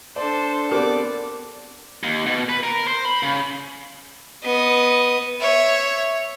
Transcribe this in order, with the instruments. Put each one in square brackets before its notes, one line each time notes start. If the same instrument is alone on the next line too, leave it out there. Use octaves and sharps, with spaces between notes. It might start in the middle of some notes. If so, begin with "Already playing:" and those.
[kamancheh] D4 C5 [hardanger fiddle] A4 [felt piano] D5
[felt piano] B3 C4 G4 [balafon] A#4 [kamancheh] D5 D6
[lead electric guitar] D#2
B2
B4
A#4
C5
B5
C#3
[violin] B3 D#5
[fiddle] C#5 E5